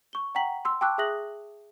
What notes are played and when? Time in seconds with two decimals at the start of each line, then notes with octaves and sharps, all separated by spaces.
0.13 C#6 G7
0.35 F#5 G5 A#5 B6 F#7
0.65 C6 E6
0.81 G5 A5 C#6 D6 E6 F#6
0.98 G#4 E5 D#6 F#6 A#6 F#7